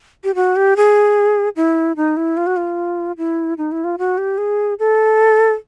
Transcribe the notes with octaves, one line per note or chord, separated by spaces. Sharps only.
G4
F#4
G4
G#4
E4
D#4
E4
F4
F#4
F4
E4
D#4
E4
F4
F#4
G4
G#4
A4